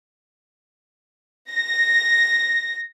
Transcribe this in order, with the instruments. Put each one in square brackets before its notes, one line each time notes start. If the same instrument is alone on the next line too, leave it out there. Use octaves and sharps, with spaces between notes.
[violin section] A#6